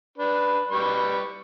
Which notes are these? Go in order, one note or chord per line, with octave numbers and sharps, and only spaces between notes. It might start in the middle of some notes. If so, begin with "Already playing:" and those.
D4 B4
G3 B4 C#6